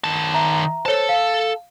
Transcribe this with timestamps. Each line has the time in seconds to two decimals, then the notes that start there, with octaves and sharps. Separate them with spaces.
0.04 D#3 A5
0.34 E5 A#5
0.86 A4 C5 C#5 A5
1.09 F5